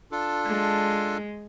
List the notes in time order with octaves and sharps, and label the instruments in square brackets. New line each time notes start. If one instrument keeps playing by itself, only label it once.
[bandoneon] D4 F4 A4
[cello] G#3